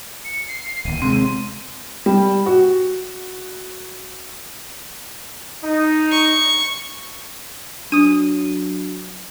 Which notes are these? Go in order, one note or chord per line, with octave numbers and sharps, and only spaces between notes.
C#7
C7
D1 D#2 D#7
C3 G#3 C4 D#7
G3
F#4
D#4
C#6
F#3 D4 D#6 D#7